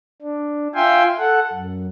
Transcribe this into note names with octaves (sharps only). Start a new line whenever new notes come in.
D4
F4 E5 F5 G5 G#5 C6
A4 F#5
F#2